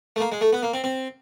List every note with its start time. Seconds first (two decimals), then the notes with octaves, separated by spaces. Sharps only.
0.16 A3
0.20 A#3
0.32 G#3
0.41 A3
0.53 B3
0.63 A#3
0.74 C4
0.84 C4